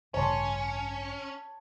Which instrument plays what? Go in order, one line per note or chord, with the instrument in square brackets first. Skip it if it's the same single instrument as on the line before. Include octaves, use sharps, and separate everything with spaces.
[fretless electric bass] A1 G2 C#3 [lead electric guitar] C#4 [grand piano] C#5 A5 C6